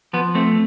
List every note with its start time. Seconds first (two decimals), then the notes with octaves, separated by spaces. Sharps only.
0.13 F3 B3
0.35 A3 C4